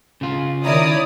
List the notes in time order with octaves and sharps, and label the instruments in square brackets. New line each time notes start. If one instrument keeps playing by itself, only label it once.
[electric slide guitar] C#3 F4
[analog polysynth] D#3 A#5 [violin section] E4 D5 D#6 [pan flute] C#5